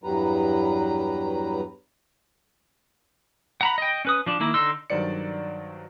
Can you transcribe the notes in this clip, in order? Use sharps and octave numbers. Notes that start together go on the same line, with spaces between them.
E2 G2 F#3 G3 B4 A#5
F#5 A#5 B5
D#5 G5
C#4 B4 D#6
F3 D4
D#3 A#3 E4
D3 D#4 C6 E6
G2 D#3 F#3 C5 D5 C#7